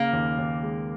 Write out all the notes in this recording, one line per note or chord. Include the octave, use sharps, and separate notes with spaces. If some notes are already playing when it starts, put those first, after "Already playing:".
Already playing: C#3 A#3
D#2
D#2
G#3